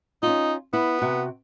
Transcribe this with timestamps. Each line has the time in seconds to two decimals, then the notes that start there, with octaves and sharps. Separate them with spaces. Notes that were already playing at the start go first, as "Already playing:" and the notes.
0.23 C#4 D#4 F4
0.73 B3 E4
1.02 C3 F#4 G5